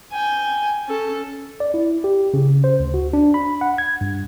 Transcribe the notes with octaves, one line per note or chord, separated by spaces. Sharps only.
G5 G#5
C#4 A4
D5
E4
G4
C#3
C5
D2
F#4
D4
B5
F#5
G#6
G2